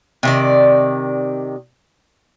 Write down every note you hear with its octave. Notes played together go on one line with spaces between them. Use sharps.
C3 D#3 D5